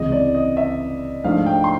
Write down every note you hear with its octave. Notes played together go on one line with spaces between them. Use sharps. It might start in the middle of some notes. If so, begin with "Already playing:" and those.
Already playing: C#2 C3 E3 G#3 D#5
D5
D#5
E5
G#2 F3 A3 D4 F5
G5
C6